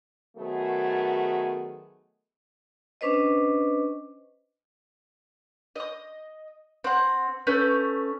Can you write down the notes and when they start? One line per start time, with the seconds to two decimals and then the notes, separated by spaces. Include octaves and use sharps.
0.37 D#3 F#3 A3 B3 G#4
3.01 C#4 D4 B4 C5 D#5
5.76 D#5 D#6
6.84 C4 F#5
7.47 A3 C#4 B4 G6